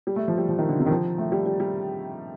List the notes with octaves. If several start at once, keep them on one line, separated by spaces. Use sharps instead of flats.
G3
A3
F3
G3
F3
D#3
D3
C3
D#3
F3
A3
G3
G3
G3